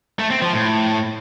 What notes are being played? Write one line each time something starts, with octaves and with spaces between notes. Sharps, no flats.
A3
C4
F3
A2